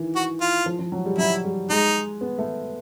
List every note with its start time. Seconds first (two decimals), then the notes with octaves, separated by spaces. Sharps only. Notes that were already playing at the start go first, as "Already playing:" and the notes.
Already playing: D#3 E3
0.15 F#4
0.41 F4
0.66 F3
0.79 F3
0.92 F#3
1.06 G3
1.18 F#3 E4
1.44 G3
1.70 G#3 D#4
2.21 B3
2.38 A3